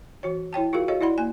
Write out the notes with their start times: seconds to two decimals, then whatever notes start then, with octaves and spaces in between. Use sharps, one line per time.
0.23 E3 F#4 C#5
0.53 E4 C#5 G5 A5
0.73 F4 F#4 G#4 A#4 F5
0.88 F#4 G#4 A4 C#5 D#5 F5
1.01 E4 D5 F#5 B5 C6
1.18 A#3 G#5